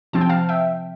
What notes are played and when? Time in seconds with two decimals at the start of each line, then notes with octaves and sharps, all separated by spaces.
0.13 C3 F3 C4 A5
0.21 G5
0.29 F5 A5
0.49 E5 G5